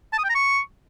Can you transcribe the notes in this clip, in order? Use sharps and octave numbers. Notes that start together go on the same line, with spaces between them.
A5
D#6
G5
A#5
C#6